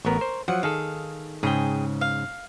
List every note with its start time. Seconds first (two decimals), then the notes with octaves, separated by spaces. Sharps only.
0.05 A1 B3 A#4 C#6
0.21 C5
0.48 F3 F#3 F#5
0.63 D#3 G#4 A4 F5
1.43 G#2 C#3 G#4 G5
2.01 F5